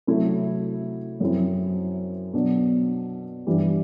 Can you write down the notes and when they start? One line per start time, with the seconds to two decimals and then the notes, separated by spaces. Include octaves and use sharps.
0.07 C3 F#3 A3 E4
1.20 F#2 F#3 C4 E4
2.33 B2 F#3 B3 D4
3.47 G2 E3 G3